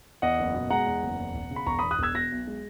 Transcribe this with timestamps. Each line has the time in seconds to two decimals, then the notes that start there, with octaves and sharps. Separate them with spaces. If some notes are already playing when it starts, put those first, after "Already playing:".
0.22 E2 D#5 F#5
0.39 F#1
0.54 B2
0.70 G#3 F#5 A#5
0.86 E2
1.03 F#1
1.19 E2
1.34 E1
1.51 C#3
1.56 B5
1.67 E1 A#5 C#6
1.79 B5 D#6
1.83 E2
1.91 D#6 F#6
1.99 E1 E6 G#6
2.14 B2 F#6 A#6
2.31 B1
2.47 G#3